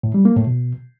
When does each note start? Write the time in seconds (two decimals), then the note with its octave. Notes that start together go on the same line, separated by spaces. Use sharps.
0.03 A2
0.14 G3
0.25 A#3
0.36 A2
0.47 B2